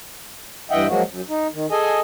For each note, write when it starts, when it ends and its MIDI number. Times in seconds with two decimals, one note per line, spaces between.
0.71 0.87 43
0.71 0.87 52
0.71 0.87 75
0.71 0.87 76
0.71 0.87 78
0.71 0.87 79
0.88 1.02 53
0.88 1.02 54
0.88 1.02 56
0.88 1.02 58
0.88 1.02 66
1.09 1.22 42
1.29 1.47 63
1.53 1.66 51
1.71 2.00 68
1.71 2.00 69
1.71 2.00 75
1.71 2.00 80